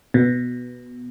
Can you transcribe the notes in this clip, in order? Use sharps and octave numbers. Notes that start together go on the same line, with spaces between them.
B2